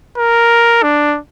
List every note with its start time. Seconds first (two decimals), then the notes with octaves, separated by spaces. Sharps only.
0.17 A#4
0.83 D4